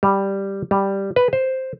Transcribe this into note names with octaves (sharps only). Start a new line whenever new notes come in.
G3
G3
B4
C5